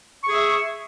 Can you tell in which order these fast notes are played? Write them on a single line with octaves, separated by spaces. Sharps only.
C#6 G#4 E5